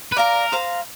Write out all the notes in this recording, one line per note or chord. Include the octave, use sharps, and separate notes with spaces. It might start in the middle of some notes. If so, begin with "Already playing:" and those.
B4
A#4 D5 F5 A#5
C5 F5 A#5